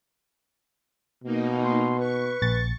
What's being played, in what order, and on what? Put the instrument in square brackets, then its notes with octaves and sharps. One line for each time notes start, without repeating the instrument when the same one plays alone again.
[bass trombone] B2 [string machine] A#3 D#4
[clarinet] C6
[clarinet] B4 [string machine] C#6
[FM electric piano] A#1 A6